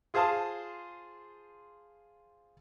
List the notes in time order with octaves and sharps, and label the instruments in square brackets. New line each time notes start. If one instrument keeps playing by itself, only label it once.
[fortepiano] F4 G#4 C5 F5 A5 D#6